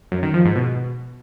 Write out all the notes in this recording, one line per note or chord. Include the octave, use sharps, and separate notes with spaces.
F#2
D#3
F3
G#2
B2